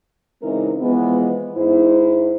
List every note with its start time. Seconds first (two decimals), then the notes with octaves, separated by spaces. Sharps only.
0.43 C#3 E3 G#3 C4 D#4 A#4
0.81 E3 F3 G#3 B3
1.56 G#2 E4 C5